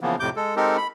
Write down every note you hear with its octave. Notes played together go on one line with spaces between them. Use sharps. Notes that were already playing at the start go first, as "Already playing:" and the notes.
C#3 E3 F3 A#3 B3
F2 A2 C3 D6 G6
G#3 A4
G#3 C4 D#4 G4 A4 A#4
B5